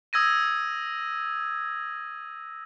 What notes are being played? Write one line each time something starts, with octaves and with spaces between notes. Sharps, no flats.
D#6 E6 G#6 A#6 D#7